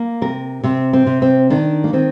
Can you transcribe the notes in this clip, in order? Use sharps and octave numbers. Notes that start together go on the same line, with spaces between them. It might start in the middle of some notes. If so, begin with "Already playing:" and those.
Already playing: A#3
C3 A#4
C3 C4
C4
C3
C4
D#3 D4
A#3
D#3 C4